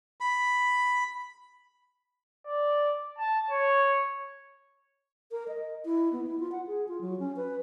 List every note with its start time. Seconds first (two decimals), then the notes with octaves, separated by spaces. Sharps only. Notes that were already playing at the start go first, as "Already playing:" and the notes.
0.21 B5
2.46 D5
3.19 A5
3.51 C#5
5.31 A#4
5.48 D#5
5.85 E4
6.12 B3
6.26 E4
6.39 F4
6.52 F#5
6.67 G#4
6.88 F4
7.01 F#3
7.19 C#4
7.36 B4